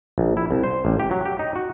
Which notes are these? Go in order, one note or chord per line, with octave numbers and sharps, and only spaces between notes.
A#1
E4
C2
C5
A1
G4
F#3
G4
D#4
F#4